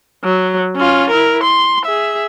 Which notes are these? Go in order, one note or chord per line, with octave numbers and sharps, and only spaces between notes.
F#3
C#4 F4
E4 A#4
C6
G#4 E5